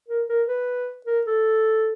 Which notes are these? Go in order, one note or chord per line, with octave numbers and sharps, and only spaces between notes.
A#4
A#4
B4
A#4
A4